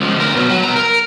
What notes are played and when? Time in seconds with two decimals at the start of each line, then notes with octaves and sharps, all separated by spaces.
0.01 C#2 F3
0.16 D2 A#4
0.35 B2 F#3
0.49 F#3
0.64 B2 A#5
0.76 A#4